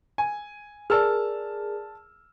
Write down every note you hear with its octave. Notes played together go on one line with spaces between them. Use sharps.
G#5
G#4 A#4 D5 A5 E6 F6